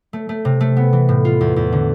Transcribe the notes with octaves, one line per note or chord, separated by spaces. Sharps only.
A3
A3
C3
A3
B3
E3
A2
F4
E2
E2
D3